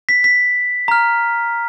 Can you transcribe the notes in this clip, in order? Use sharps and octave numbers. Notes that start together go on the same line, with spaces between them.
B6
B6
A#5 F6